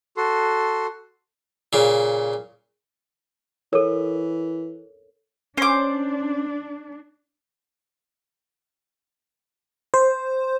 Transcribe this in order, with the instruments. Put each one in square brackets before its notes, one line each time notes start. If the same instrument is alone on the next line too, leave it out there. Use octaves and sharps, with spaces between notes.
[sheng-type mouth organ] F#4 A4 C6
[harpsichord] A#2 C#3
[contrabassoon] E3 [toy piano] A4 A#4 [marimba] C#5
[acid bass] C#4 [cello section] D4 [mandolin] C5 D6
[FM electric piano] C5